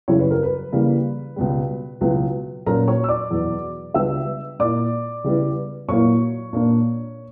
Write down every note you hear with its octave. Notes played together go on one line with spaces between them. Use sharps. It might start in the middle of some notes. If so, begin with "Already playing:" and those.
F#2 C#3 G3 C#4 E4 C#5
B4
A#4
B4
C#3 E3 G3 A#3
C#2 B2 G3
C#2 B2 F#3 B3 E4
A#2 F#3 A#3 C#4 A#4 A#5
C#5 C#6
E6
D5 D6
E2 B2 F#3
C#2 C#3 G3 B3 D4 E5 E6
A#2 A#3 E4 D5 D6
C#3 G3 B3 E4
A#2 F#3 A#3 E4 C#5 C#6
A#2 A#3 D4